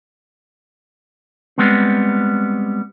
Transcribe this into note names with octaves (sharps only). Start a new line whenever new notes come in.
G3 G#3 B3 C4